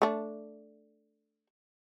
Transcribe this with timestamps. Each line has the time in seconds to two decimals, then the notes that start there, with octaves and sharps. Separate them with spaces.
0.02 A3 D4